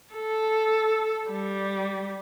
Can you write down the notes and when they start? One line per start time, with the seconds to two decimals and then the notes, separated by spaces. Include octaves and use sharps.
0.14 A4
1.30 G3